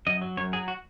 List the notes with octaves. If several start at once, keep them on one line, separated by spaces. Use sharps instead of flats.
F#2 D#5
F#3
F#2 C#5
F#3 G#4
F#4